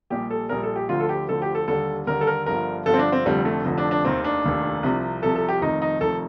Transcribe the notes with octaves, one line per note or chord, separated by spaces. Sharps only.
A#1 A#2 G3 G4
A4
A#1 A#2 G3 A#4
A4
G4
D2 D3 F3 F4
A4
G4
D2 D3 F3 A4
G4
A4
D#2 D3 G3 A4
D#2 D3 G3 A#4
A4
A#4
G1 G2 D3 F3 A#4
G1 G2 D3 F3 A4
C4
D4
C4
F1 F2 D3 F3 G3
A3
F1 F2 D3 F3
D4
D4
F1 D#2 D#3 C4
D4
F1 D#2 D#3
C2 C3 F3
C2 C3 F3 A4
A4
G4
F1 F2 D#3 D#4
D#4
F1 F2 D#3 A4